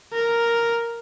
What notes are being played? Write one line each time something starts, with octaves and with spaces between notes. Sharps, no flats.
A#4